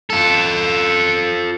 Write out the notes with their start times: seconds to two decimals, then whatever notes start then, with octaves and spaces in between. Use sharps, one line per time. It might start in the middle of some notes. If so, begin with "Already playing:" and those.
0.10 F4 A4